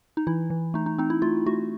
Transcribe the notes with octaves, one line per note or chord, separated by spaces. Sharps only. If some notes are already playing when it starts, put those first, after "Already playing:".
D#4
E3 E4
E3
A3 D#4
D#4
C4 D#4
E4
A3 F4
A3 F#4